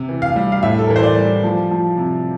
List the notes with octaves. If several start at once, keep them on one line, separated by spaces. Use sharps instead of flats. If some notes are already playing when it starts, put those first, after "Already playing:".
Already playing: C3
E3
F5
G3
F5
A2 E5
A4
A#4
E3
C5
D5
G3
F3
F3
C3